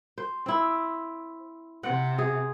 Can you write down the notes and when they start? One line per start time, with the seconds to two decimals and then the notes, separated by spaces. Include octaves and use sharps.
0.18 C5
0.46 C4 E4
1.83 C3 F#5
2.18 G#4